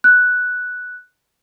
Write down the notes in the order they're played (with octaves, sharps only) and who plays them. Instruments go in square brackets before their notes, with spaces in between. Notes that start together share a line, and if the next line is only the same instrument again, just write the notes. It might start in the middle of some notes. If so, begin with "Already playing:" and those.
[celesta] F#6